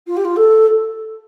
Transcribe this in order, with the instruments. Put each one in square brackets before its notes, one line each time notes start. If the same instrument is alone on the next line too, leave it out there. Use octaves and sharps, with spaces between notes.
[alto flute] F4
G4
F4
A4